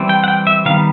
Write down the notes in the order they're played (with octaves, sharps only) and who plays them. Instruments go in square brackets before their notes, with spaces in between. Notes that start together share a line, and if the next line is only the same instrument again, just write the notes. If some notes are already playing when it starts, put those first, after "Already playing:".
Already playing: [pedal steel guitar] E3 G3 C4
G5
F#5
G5
E5
D#3 G3 B3 F5